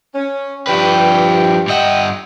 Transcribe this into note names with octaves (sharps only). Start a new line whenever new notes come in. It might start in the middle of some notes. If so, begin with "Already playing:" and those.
C#4
G2 F3 B4 G5
G2 D#5 E5 F#5 G5